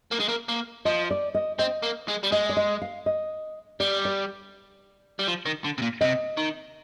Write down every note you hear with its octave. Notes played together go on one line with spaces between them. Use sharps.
A#3
G#3
A#3
A#3
F3 D#5
D5
D#5
C4 D#5
A#3
G#3
G3
G#3 D#5
D5
D#5
F5
D#5
G3 D5
D5
G3
F3
D#3
D3
C3
A#2
C3 D#5
D#3